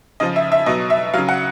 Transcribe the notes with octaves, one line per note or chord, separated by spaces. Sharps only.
C#3 F3 D#5
E5
E5
B2 F#3 D#5
E5
C#3 F#3 F5
F#5